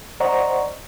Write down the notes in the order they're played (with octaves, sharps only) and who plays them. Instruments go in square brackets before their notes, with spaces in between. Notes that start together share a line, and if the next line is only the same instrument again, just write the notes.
[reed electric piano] C5 D5 D#5 F#5 A#5 C#6